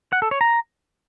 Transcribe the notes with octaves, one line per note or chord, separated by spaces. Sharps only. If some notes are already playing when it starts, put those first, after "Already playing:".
F#5
A4
C#5
A#5